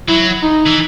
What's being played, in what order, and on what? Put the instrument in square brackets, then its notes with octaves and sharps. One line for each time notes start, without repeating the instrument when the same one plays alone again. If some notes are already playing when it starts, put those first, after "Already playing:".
[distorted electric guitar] F#3 [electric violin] E4
[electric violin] D#4
[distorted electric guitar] E3